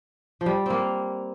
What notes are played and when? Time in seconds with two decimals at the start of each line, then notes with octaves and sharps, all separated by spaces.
0.41 F3
0.46 G3
0.66 A#3 C4